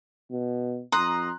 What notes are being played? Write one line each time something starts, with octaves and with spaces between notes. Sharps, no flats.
B2
F2 A#5 C6 D#6 F#6